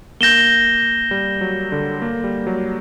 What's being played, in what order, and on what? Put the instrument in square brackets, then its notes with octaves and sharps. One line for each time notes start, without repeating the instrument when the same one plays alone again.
[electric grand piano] A#3 [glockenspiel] G6 A#6 E7 G7
[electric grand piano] G3
F#3
D3
A#3
G3
F#3